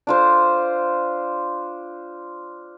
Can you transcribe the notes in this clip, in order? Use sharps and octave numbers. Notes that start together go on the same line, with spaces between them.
D4 F4 C5